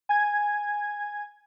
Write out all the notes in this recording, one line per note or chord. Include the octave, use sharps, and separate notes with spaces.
G#5 G#6